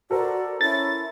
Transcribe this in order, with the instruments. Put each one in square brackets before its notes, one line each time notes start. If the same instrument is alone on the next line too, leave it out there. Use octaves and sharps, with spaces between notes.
[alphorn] F#4 [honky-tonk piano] A4 A#4 C5 [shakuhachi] D5
[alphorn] C#4 [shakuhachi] E4 [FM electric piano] A6